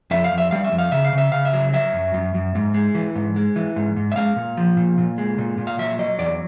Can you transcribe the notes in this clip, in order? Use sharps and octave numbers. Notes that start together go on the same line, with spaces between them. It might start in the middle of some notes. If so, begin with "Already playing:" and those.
F2 E5
F5
F2
E5
G3 F5
E5
F2
F5
C#3 E5
F5
C#3
E5
C#3 F5
E5
F#3
F#3 E5
F#2
F#2
F#2
G#2
G#3
E3
G#2
G#3
E3
G#2
G#2
E5
G#3 F5
A#2
F3
A#2
A#2
G#3
A#2
A#2
F5
F#3 E5
F#3 D#5
E2 D5